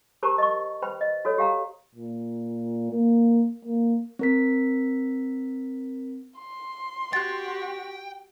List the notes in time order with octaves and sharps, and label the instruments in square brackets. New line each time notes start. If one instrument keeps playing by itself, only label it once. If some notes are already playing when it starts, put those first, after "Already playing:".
[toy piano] G4 A#4 C5 A5 A#5 C#6
D#5 C#6
B4 C5 G5 B5
D#5
F#4 A4 C#5
G4 F5 A#5
[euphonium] A#2
A#3
A#3
[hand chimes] C4 A#4 B6
[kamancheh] C6
[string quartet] F#4 G4 [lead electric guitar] G5 [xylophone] F#6 A6